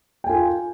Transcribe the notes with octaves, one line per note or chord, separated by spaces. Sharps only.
F4 G5 G#5